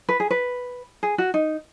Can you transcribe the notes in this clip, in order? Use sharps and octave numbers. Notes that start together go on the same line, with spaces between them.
B4
G#4
B4
G#4
F#4
D#4